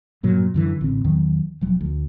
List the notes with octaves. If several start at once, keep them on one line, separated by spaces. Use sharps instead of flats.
G2 A#2 F#3
F#2 D3 E3
A1 D3 C4
E2 D#3 F#3
E1 F3 F#3
D2